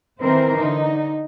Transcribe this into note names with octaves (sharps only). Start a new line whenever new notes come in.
D#3 E3 C4 A#4 C5
D3 D#4